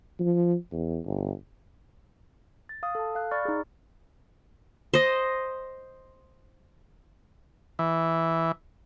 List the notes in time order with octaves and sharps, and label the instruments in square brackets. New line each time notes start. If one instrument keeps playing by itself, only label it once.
[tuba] F3
E2
G1
[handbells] A6
F5 D#6
A4 A5
F5 F#6
D5 B5 C#6 F6 A6
D#4 G#4
[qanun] C5 D#5
[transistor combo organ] E3